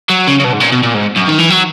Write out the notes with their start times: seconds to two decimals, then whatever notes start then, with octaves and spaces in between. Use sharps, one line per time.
0.10 F#3
0.27 C#3
0.40 C#3
0.44 B2
0.53 G#2
0.60 A#2
0.72 B2
0.83 A#2
0.94 G#2
1.17 F#2
1.28 D#3
1.39 E3
1.50 F#3